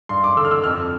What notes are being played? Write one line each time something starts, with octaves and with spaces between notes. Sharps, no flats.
G2 C6
D6
D3 E6
F6
E6
F2 F6